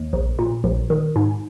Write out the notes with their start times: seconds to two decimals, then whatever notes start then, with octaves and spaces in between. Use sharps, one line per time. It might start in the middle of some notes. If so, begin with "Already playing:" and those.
Already playing: D#2
0.13 A#1
0.39 A#2
0.64 A#1
0.90 D#3
1.16 G#2